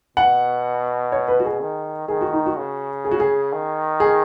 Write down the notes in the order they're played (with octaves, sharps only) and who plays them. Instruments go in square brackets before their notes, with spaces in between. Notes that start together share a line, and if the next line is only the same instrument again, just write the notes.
[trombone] B2 [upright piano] F#5
[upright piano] C#5
B4
F#4
G#4
[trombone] D#3
[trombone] D#3 [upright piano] G#4
[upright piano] F#4
D#4
F#4
[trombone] C#3
[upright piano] G#4
F#4
G#4
[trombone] D#3
[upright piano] G#4